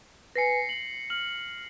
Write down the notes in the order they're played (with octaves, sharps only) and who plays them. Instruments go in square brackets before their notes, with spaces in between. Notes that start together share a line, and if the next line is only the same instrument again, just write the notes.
[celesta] B4 G#5 [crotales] A#6 C7 C#7
[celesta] F#7
[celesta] F6 [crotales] F#7